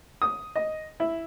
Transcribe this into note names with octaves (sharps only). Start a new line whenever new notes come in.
D#6
D#5
E4